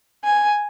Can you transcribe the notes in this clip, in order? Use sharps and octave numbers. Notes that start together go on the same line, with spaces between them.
G#5